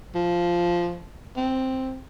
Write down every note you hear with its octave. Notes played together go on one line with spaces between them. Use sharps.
F3
C4